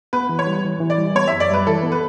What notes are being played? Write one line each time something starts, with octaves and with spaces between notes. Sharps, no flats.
B3 B4
E3
C#5
G3
E3
E3
D5
G3
B3 C#5
E5
F#2
D5
G3 B4
E3 A4
B3
B4